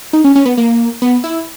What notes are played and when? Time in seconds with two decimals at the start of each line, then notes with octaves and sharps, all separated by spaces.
0.13 D#4
0.24 C#4
0.35 C#4
0.45 B3
0.57 A#3
1.02 B3
1.24 E4